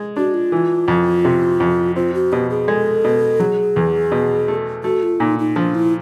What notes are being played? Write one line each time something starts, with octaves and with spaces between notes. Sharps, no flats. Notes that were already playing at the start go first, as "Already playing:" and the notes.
Already playing: G#3
D4 F#4
F4
E3
F2
C3
F2
C4 F4
F#4
B2 G4
G#4
G#3 A4
B2
F#3 G#4
E2
B2
A3
A3 F#4
F4
A#2 D#4
D#4
F3 D4
E4